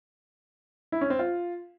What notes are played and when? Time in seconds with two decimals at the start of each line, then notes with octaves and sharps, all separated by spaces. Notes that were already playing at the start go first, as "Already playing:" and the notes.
0.92 E4
1.01 C#4
1.10 C4
1.19 F4